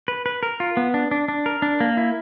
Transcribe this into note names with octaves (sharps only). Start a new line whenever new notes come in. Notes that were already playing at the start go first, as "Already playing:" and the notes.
B4
B4
A#4
F4
B3
D4
D4
D4
A#4
D4
A#3
E4